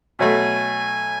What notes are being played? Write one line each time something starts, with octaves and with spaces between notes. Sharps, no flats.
B2 F#3 A3 G#5